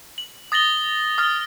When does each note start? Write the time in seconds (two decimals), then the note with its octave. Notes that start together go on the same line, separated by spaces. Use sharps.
0.18 F#7
0.52 D#6 A6 A#6 F#7 G7
1.18 D#6 F6 A6 G7